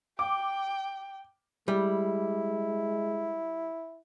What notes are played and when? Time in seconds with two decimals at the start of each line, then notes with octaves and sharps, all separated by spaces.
0.19 G5 D6
1.68 G3 G#3 E4